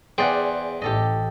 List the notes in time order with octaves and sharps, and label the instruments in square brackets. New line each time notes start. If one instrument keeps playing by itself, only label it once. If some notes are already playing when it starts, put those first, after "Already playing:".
[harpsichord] E2 G#4 G5 [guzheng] C5 D5 F#5
[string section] A1 [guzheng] G4 A4 D#5